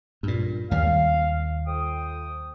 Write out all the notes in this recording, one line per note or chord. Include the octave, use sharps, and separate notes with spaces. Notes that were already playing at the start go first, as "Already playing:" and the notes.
G2 A#2
D#2 G3 F5
F2 G5 D#6